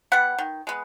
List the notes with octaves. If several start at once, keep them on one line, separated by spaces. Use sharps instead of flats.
G3 B3 F#5
D#3
G#3 B3